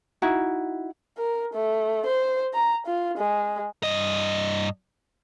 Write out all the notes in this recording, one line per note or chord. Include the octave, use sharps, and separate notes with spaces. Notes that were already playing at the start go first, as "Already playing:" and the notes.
D#4 E4 F#4
A#4
A3
C5
A#5
F4
G#3
G2 D#5